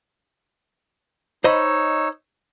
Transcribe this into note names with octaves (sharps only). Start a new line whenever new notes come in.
D#4 C5 C#5 D#5 B5 E6